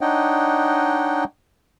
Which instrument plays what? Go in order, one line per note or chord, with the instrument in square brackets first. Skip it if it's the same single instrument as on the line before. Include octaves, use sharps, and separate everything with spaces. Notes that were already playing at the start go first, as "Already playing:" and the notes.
[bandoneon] D4 D#4 C#5 D#5 F#5 G5